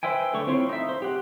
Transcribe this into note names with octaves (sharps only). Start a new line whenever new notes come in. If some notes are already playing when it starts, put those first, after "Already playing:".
B4 C5 E5 G5 G#5
D3 A3 C#5 C#6
C4 E4 F4 C#5 C6
D#4 E5
C5
G4 F#5